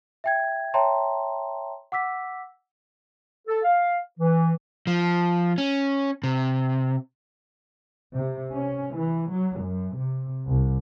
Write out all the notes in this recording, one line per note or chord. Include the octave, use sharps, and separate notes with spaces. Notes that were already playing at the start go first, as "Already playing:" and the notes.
E5 G5 G#6
C#5 E5 G5 A5 A#5 C6
F#5 D6 E6 B6
A4
F5
E3
F3
C#4
C3
C3
C#4
E3
F#3
F#2
C3
C2